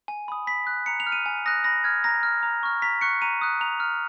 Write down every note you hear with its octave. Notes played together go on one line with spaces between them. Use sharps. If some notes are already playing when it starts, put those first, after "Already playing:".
G#5
B5 D#6
B5 B6
F#6
A#5 C#7
F7
F6
D#7
G#5
D#6 F#6 A#6
B5 A#6
F6 G#6
A#5 A#6
F6
A#5
C#6 F6
A#5 B6
C#6 F#6 C#7
A#5 D#7
D#6 F#6
A#5 F7
F6